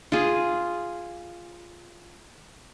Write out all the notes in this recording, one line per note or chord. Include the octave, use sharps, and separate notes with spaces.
F4 G#4